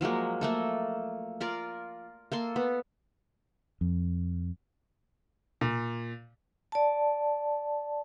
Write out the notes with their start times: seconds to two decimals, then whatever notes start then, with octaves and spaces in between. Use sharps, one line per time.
0.01 F3 F#3 G#3 A#3
0.41 A3 A#3 A4
1.40 F4 A#4 D5
2.32 A#3 A4 C6
2.56 B3
3.81 F2
5.61 A#2
6.72 D5 A5